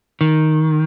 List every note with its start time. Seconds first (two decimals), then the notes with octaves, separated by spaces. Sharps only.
0.21 D#3